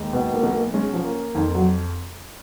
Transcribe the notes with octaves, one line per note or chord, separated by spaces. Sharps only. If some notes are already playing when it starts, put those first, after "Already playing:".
Already playing: D#2 G#3
B2 B3
A#3
B1
A#3
G#3 C#4
F3
A#3
F2 D#3
F#3